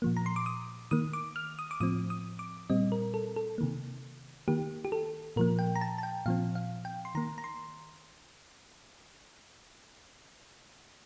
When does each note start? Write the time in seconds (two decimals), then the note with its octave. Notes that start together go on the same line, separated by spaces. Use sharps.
0.02 A#2 F3 A#3
0.17 A#5
0.26 C6
0.36 D6
0.46 D#6
0.91 D#3 A#3 D#6
1.13 D6
1.36 F6
1.59 D#6
1.71 D6
1.80 A2 F3 C4 D#6
2.10 D#6
2.39 D6
2.70 A#2 G3 C4 D#5
2.92 A#4
3.14 A4
3.36 A4
3.58 C3 D#3 A#3
4.48 D#3 A#3 G4
4.85 G4
4.92 A4
5.36 A#2 F3 A#3 A#4
5.59 G5
5.76 A#5
5.81 A5
5.98 A5
6.03 G5
6.26 A#2 F3 C4 F5
6.55 F5
6.85 G5
7.05 C6
7.15 D#3 A#3 A#5
7.38 A#5
7.44 C6